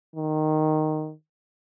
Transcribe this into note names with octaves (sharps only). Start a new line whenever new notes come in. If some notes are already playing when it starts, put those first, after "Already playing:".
D#3